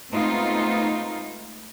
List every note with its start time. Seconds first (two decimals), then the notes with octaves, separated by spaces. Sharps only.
0.11 G#3 A3 B3 C4 D#4 F4